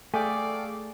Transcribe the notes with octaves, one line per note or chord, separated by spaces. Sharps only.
A3 G#4 A4 D5 F5 G5 G#5